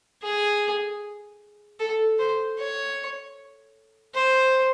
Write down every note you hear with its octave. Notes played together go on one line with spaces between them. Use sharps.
G#4
A4
C5
C#5
C5